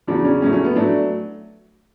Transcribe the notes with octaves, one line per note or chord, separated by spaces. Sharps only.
E2 C#3 F#3 D4
C#4
A2 F#3 A3 C#4
C#4
B3
F#3 A3 D4